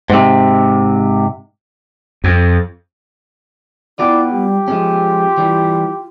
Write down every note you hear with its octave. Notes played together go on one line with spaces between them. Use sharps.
G#2 C3
F2
B3 E4 F4 D5 G5
G3 G4
F3 G#3 C#4 F4
E3 G3